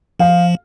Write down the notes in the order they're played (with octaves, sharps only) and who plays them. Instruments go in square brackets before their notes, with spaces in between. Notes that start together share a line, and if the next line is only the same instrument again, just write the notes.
[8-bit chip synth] F3 [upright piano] F5